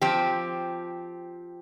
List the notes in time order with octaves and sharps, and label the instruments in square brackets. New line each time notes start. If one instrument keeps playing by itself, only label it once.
[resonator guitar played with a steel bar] F3 C4 G4